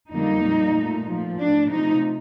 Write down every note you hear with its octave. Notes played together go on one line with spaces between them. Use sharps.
F2 D3 G3 A#3 D#4
A#2 G3 A#3
A#2 A3
A#2 F3 A3
A2 A3 D4
C3 F3 A3 D#4